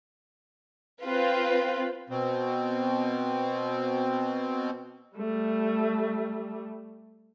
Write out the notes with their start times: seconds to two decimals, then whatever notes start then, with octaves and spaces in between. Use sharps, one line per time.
1.01 C4 F4 B4
2.10 B2 C4
5.17 G3 A3